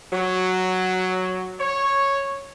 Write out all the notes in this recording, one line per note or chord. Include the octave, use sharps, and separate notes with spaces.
F#3
C#5